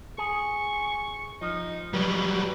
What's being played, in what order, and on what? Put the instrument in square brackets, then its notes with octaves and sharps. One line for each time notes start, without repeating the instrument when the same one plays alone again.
[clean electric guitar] G#4 [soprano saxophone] C#6
[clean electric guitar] F3 [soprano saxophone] D#4
[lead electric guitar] F#3 G3 [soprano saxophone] B4